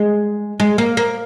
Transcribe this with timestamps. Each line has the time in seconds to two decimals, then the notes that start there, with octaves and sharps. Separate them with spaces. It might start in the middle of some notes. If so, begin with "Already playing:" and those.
Already playing: G#3
0.60 G#3
0.78 A#3
0.97 A#3